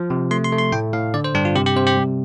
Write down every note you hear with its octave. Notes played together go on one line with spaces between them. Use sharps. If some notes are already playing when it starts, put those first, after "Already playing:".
Already playing: F3
C3
A3 C6
C6
A3
C6
A2 G5
A2 F5
D3 D5
C5
G2 D4
F4
C3 G4
G4
C3 C5
G4
G3